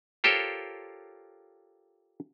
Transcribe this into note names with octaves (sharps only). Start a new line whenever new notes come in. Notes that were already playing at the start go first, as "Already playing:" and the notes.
F4 G4 A4 A#4 C5 C#5